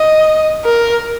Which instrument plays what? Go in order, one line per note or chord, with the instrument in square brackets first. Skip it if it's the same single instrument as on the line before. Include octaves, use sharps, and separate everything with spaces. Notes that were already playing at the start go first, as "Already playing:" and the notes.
Already playing: [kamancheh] D#5
A#4